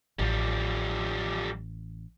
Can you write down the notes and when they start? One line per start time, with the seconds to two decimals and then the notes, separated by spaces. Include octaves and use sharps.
0.19 A1 F3 G3